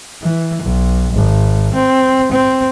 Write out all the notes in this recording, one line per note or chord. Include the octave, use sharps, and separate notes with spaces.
E3
B1
G#1
C4
C4